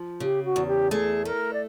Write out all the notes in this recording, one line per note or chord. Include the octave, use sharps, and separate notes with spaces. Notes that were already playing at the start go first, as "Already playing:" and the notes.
Already playing: F3
C#3 G4
F#4
E2
G4
A3 G#4
A3 A#4
D5